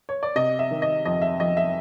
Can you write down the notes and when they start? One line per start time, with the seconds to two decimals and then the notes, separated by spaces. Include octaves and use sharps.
0.09 C#5
0.23 D5
0.36 C3 D#5
0.59 E5
0.71 D#3
0.82 D#5
1.05 F2 D#5
1.22 E5
1.39 F2 D#5
1.57 E5